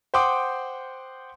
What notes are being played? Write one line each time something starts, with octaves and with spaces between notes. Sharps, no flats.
C5 F#5 G5 C6 D6 D#6